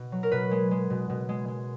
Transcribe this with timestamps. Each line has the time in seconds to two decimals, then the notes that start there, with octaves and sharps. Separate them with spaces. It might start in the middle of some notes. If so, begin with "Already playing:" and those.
Already playing: B2
0.12 F#3
0.23 A#4
0.31 B2 B4
0.51 G#3
0.71 G#3
0.90 B2
1.10 B2
1.29 G#3
1.48 G#3